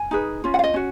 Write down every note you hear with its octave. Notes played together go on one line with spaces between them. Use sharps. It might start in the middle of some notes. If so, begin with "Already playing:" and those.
Already playing: G#5
D#4 G#4 B4
C#4 F4
F#5
F5
D#5
C#4 F#4